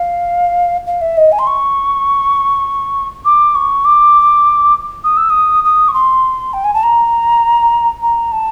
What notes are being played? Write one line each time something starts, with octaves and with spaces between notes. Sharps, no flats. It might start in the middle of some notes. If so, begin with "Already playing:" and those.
Already playing: F5
F5
E5
D#5
G#5
C6
C#6
D6
C#6
D6
D#6
E6
D#6
D#6
C#6
C6
G5
G#5
A5
A#5
A#5
A5